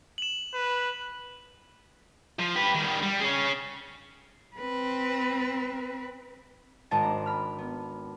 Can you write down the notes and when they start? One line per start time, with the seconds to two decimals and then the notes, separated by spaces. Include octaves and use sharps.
0.18 E7 F#7
0.54 B4
2.39 F3
2.56 G4 B4
2.75 D#3 G3
3.03 G3
3.20 C#4 G#4
4.56 C4 B4
6.91 G#1 C5 D#5 A5 A6 D7
7.03 D4 A#5
7.26 B5 F6
7.58 B3